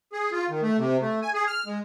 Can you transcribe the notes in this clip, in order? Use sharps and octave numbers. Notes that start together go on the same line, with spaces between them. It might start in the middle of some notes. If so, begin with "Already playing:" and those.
G#4
F4
D#3
A3
C3
A3
G#5
G#4
F6
G#3